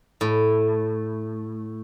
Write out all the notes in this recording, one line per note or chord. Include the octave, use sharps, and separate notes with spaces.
A2